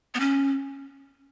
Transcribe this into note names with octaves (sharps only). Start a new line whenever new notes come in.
B3
C#4